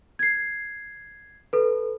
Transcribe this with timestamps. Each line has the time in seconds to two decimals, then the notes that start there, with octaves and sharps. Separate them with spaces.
0.19 G#6 C7
1.53 A4 B4